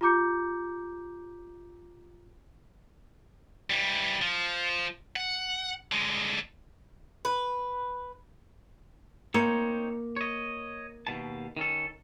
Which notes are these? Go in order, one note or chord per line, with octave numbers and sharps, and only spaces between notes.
F4 G4 A#5 D6 G6 C#7
E3 G3
F3
F#5
D3 G#3
B4
A#3 C4 D#4 C#5
C#5 D#5
D#2 B2 A5
D#3 C#4 A4